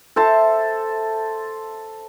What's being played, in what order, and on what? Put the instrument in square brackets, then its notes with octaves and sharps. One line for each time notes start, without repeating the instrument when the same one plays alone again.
[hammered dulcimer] A4 C5 E5 A5